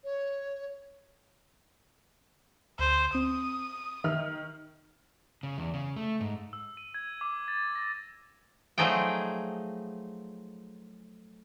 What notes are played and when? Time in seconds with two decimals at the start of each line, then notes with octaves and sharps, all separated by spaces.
0.04 C#5
2.79 D2 C5
3.15 C4 D#6
4.04 D#3 E5 F6
5.43 C#3
5.58 E2
5.74 C#3
5.96 A3
6.20 G#2
6.53 E6
6.77 D#7
6.94 G#6
7.21 D6
7.48 A6
7.75 A#6
8.78 F3 F#3 A3 D#4 G#4 G5